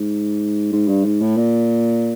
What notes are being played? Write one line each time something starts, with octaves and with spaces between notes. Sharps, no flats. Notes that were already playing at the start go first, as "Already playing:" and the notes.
Already playing: G#2
G#2
G2
G#2
A2
A#2